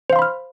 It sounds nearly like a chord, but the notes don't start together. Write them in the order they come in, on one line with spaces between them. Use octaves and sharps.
C5 F5 C6 B5 F6